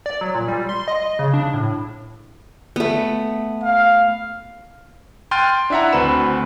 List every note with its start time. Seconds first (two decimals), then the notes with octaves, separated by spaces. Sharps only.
0.06 D5
0.21 F#3
0.35 A#2
0.48 G3
0.69 C6
0.88 D#5
1.19 C#3
1.34 D4
1.54 A2
2.76 A3 B3
3.63 F5
5.31 G5 C6 F6 F#6 A6 D#7
5.70 D4 E4 E5 F#5 A#5
5.93 D2 C4 F#4 B4 B5 E7